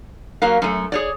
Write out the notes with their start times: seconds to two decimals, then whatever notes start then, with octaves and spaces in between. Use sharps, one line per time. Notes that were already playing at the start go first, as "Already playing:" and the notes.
0.42 F#3 A#3 A#4 F5
0.62 F#2 A3
0.92 G#4 C#5 D5